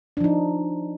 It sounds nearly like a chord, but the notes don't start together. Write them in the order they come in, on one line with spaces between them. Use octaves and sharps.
D4 F3 D#4